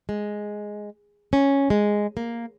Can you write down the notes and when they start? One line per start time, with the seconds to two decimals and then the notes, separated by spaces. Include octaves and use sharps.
0.09 G#3
1.33 C#4
1.70 G#3
2.17 A#3